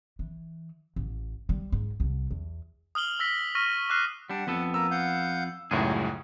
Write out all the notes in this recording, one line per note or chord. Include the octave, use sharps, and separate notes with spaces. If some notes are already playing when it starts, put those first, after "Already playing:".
E3
A1
G3
G#2
C2
E2
D#6 F6 F#7 G7
E6 A#6 B6
C#6 F6 A#6 B6 D#7
D6 F6 F#6 C7
G3 D4 F#5
F2 B3 A4
A#3 A#4 A#5 E6
F5 F#5 G6
C#2 F#2 A2 G3 B3 D#4 F#4 G#4
D3